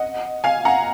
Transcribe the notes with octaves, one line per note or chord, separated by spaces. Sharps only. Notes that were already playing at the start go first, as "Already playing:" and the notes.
Already playing: D#5 F#5
F5 G#5
F#5 A#5